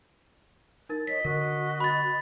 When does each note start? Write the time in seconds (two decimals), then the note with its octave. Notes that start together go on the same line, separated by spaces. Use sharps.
0.89 D#4 A#4 A6
1.07 C#5 D#5 B6
1.25 D3 F#4 A#4 D#5
1.80 B5 A6